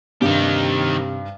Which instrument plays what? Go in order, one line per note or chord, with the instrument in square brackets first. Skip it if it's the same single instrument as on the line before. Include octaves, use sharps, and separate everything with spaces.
[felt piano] G2 [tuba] C3 [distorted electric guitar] D#3 G4